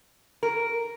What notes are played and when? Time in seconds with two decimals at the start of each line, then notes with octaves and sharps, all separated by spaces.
0.43 A#4